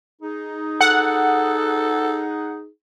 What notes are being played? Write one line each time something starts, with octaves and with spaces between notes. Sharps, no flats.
D#4 G#4
A4 F#5